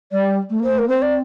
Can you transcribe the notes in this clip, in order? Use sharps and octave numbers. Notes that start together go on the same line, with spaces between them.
G3 D5
A3
A#3 C5
A3
A#4
A#3
C4 C5
D5